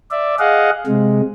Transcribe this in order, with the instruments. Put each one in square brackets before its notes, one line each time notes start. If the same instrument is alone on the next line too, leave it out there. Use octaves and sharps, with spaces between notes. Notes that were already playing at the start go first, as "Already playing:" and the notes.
[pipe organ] D5 E5
G#4 D#5 F5 F#5
C3 G#3